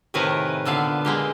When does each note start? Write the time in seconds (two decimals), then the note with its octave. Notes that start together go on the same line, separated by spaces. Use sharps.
0.14 A2 C3 D#3 A#4 B4 G#5
0.65 A#2 D3 B3 F5
1.05 G#3 A#3 G4